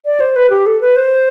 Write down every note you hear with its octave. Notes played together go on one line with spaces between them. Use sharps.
D5
C5
B4
G4
A4
B4
C5